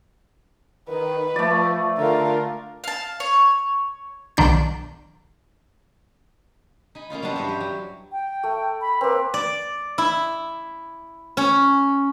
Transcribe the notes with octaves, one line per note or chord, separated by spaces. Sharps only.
D#3 B4
F3 A3 D5
D3 F4 A#4
F5 A5
C#5
B1 D#3 D4 G6
D#4 G#5 B5
A#3 C#4 D#4 F4
F#3 G3 B3 D4 C5 C#5
G2 E4 C5 C#5 D#5
G4
F#3
G5
A3
B5
A#3 C4 B4
D5
E4
C#4